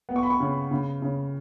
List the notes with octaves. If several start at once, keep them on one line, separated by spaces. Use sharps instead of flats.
B3
C#6
B5
C#6
C#3
C#3
C#3